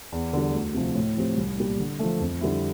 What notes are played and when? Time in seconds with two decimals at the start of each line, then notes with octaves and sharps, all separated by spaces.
0.12 E2
0.33 D3 G3
0.54 D2
0.74 C3 F3
0.95 A2
1.16 F3 C4 G4
1.37 C2
1.58 A#2 G3
1.79 D3
1.99 F3 A3
2.20 F2
2.41 D3 G3 C4 E4